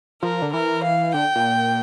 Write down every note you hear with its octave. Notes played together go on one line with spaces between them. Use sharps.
F3 A#4
D3
E3 A#4
F5
D3 G5
A#2